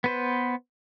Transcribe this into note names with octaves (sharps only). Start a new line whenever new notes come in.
B3 B4 C5